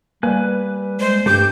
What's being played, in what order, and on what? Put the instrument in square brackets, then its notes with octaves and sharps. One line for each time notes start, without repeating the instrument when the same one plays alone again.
[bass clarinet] G3 [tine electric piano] A#3 [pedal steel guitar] B4 G#5 F#6
[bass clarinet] G#3 [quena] C5
[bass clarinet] G2 [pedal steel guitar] A3 G4 D6 [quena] G6